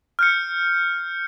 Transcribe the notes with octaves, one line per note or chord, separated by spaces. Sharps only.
F6 G6 C#7